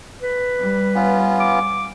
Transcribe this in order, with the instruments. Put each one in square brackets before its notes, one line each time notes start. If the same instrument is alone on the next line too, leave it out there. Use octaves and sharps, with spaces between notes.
[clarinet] B4
[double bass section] G3
[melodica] B3 C#4 F4
[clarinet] D6